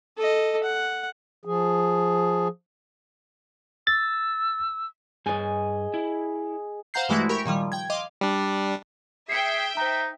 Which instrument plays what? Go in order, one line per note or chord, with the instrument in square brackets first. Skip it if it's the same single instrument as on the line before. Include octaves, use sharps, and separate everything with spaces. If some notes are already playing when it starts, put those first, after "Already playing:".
[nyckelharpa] A4 D#5
F#5
[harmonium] F3 G#4
[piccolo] E6 [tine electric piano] A6
[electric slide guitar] G2 G#5 [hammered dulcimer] G#4 D#5
[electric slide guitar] E4
[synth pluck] C5 F5 F#5 A#5 G6 C7
G2 E3 G#3 A3 E4 F#4
G4 A#4 B5 C#6
A#2 D#3 F3 G3
G5 G#6
D#5 F5 C6 D6
[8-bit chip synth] G3 D4
[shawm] G#4 [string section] E5 G5 [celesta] C7 C#7
[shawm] D#4 [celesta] C5 A#5